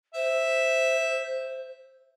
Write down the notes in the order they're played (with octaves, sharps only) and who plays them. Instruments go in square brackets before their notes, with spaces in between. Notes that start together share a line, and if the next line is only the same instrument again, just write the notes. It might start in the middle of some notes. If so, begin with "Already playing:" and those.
[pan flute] C5 [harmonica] E5